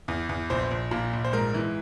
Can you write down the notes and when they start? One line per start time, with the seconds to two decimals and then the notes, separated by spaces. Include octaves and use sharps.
0.08 E2
0.29 E2
0.50 A#1 C5
0.71 A#1
0.91 A#2
1.13 A#1
1.24 C5
1.33 G#2 A#4
1.54 E3